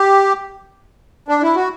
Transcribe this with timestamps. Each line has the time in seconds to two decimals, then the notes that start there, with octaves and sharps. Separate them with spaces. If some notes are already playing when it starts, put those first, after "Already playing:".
Already playing: G4
1.28 D4
1.42 E4
1.55 F#4